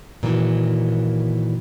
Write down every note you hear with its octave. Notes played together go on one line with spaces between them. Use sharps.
A#2 D#3 E3 F#3